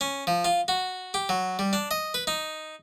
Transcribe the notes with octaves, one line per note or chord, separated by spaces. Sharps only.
C#4
F3
F4
F#4
G4
F#3
G3
D4
D#5
B4
D#4